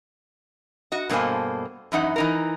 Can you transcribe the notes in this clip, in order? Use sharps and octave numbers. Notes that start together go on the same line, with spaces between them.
F#4 D#5
G2 B2 A#3 A4 C5 G#5
F#2 E3 D#4 F#5
E3 D#4 A#4